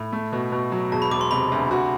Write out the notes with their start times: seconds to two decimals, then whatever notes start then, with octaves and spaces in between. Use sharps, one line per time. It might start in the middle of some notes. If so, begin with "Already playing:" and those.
Already playing: A2 B5
0.12 A3
0.33 B2
0.52 B2
0.72 F#3
0.92 E1 A5
1.02 B5
1.11 E1 D6
1.21 C6
1.31 C3 B5
1.52 D2
1.71 F#4